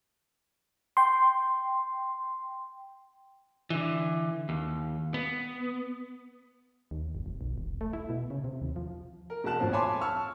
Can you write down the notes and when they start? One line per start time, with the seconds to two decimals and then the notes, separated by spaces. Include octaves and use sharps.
0.97 G5 C6
3.70 D3 E3
4.49 D#2
5.14 B3
6.91 D#2
7.15 G1
7.26 F1
7.41 B1
7.58 E1
7.81 A3
7.93 E4
8.10 B2
8.30 C#3
8.44 C3
8.62 D#2
8.76 F3
9.30 A#4
9.44 E1 G#3 F#4 A5 F#6 E7
9.60 G#1 A2 F3
9.73 C#5 G#5 A5 B5 C6 D6
10.01 A5 C#6 E6 F6